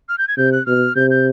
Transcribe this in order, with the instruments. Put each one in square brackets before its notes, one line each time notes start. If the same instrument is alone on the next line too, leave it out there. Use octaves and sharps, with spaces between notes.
[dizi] F6
G6
G#6
[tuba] C3 [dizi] G6
[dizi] F#6
[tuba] B2 [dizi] F6
[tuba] C3 [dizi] G6
[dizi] G6